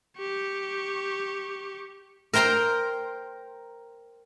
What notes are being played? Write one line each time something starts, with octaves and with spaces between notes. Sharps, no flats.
G4 C#6
A#4 C5 G5 A#5 C6